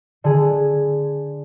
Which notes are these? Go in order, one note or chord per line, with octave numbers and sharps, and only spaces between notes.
D3 G#4